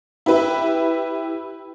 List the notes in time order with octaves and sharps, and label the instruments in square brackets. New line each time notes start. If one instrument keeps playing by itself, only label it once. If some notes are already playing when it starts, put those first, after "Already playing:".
[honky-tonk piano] E4 G4 B4 E5